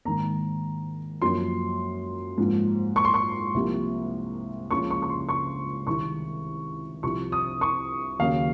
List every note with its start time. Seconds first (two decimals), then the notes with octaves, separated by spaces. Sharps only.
0.05 G#2 D#3 A#3 A#5
1.22 F#2 F3 A#3 C6
2.38 G#2 F3 A#3
2.96 C#6
3.05 C6
3.14 C#6
3.54 C2 C3 F3 A#3
4.70 C#2 C#3 F3 A#3 C#6
4.90 C#6
5.02 C#6
5.10 C6
5.29 C#6
5.87 C2 C3 D#3 G#3 C#6
7.03 C2 C3 F3 C#6
7.32 D#6
7.61 C#6
8.19 D#2 C#3 F#3 A#3 F5